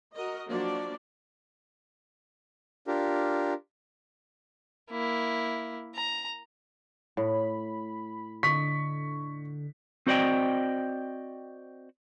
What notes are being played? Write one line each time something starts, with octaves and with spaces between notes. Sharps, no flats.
F#4 A#4 D#5
F3 F#3 A#3 D4 F#4 D5
D4 F4 G4 A#4
A#3 E4
A#5
A2 B5
D3 D#5 C#6 B6
C4 F#4 C5 D5 D#5 G5